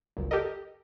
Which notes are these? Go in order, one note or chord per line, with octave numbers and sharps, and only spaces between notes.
G1 C#2 F#2
G4 A4 A#4 D#5